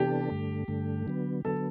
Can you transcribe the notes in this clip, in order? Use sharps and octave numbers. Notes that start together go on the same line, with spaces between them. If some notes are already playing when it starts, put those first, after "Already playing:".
Already playing: C3 E3 B3 D4 G4 A4
G2 D3 A3
G2 D3 A3
D3 F#3 B3
D3 F#3 B3 A4